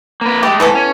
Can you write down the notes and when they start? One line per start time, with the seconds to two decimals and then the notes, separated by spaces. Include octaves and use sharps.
0.21 A#3 B4
0.43 G#3 A3 G4
0.60 G#2 E3 A3 B3 A4
0.75 C#4